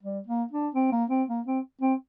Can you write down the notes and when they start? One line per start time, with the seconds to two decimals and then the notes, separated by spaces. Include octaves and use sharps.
0.03 G3
0.27 A#3
0.51 D4
0.75 C4
0.92 A#3
1.10 C4
1.29 A#3
1.47 C4
1.81 C4